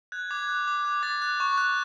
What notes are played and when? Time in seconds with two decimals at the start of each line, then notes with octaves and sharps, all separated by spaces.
0.12 F#6 G#6
0.31 D6 G#6
0.49 F#6
0.68 D6
0.85 F#6
1.03 D6 A6
1.22 F#6
1.40 C#6
1.58 F#6